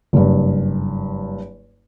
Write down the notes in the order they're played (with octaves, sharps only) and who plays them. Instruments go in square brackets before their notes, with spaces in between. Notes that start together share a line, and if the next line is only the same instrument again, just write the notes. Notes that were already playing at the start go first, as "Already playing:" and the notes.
[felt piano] F#1 G2